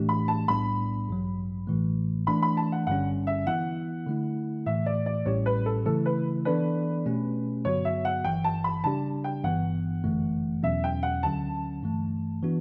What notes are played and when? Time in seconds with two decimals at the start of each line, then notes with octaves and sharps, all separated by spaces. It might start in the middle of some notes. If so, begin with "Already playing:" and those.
Already playing: A2 E3 A3 D4 G4
0.09 B5
0.28 A5
0.48 B1 A2 G3 B3 D4 B5
1.08 A1 G2 F#3
1.67 A1 A2 E3 A3
2.27 E3 A3 D4 B5
2.42 B5
2.57 A5
2.72 F#5
2.87 G1 G2 D3 G3 C#4 F#5
3.27 E5
3.47 E3 B3 E4 F#5
4.07 D3 A3 E4
4.66 A2 E3 A3 E5
4.86 D5
5.06 D5
5.26 A1 A2 G3 C#4 G4 C#5
5.46 B4
5.66 A4
5.86 C#3 E3 A3 E4 A4
6.06 B4
6.45 E3 B3 D4 A4 B4 D5
7.06 B2 A3 C#4 G4
7.65 G2 D3 F#3 B3 F#4 C#5
7.85 E5
8.05 F#5
8.24 G1 G2 E3 G5
8.44 A5
8.64 B5
8.84 C#3 G3 D4 G4 A5
9.24 G5
9.44 G1 G2 E3 B3 F#5
10.04 G1 F#2 E3 A3
10.63 E2 B2 F#3 C#4 E5
10.84 G5
11.03 F#5
11.23 D2 D3 F#3 C#4 A5
11.83 G2 E3 A3
12.42 E3 B3 D4 F#4